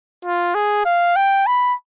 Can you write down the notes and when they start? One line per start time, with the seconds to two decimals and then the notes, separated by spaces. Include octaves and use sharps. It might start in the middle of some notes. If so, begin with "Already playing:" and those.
0.25 F4
0.55 G#4
0.85 F5
1.16 G5
1.47 B5